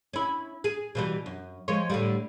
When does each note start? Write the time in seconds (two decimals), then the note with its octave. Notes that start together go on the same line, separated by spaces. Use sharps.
0.13 C#4 E4
0.64 G#4
0.95 B2 E3 G3
1.26 F#2
1.68 F3 G#3 C#5
1.90 A2 D3 G3